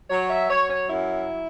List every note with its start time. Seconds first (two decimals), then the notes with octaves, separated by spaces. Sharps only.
0.10 F#3 C#5
0.30 E5
0.50 F#3 C#5
0.69 C#5
0.90 F#2 E4